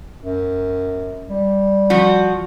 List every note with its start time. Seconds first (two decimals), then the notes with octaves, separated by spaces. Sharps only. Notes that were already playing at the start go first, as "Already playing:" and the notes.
0.21 F#2
1.30 G3
1.90 F3 F#4